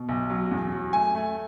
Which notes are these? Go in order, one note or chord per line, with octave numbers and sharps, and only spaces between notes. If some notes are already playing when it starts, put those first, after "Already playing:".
Already playing: B2
B1
F#3
E2
F#3
A3 G#5
A3